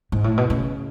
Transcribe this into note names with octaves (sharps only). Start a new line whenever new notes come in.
G#2
A2
B2
C#3